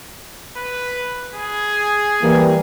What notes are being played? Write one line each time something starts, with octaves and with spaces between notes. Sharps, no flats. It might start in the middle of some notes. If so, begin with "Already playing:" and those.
B4
G#4
E3 G3 A#3